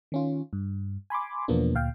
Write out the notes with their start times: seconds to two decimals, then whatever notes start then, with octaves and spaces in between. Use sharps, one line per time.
0.12 D#3 C#4 F4
0.53 G2
1.10 G#5 B5 C6 D6
1.48 E2 B2 F3 A#3 B3 D4
1.74 D2 A#2 F5 G5